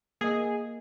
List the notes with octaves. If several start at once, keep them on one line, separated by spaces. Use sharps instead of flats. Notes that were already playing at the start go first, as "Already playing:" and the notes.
A#3 G#4 D#5